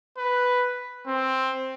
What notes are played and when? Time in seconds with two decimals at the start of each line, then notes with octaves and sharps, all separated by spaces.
0.17 B4
1.07 C4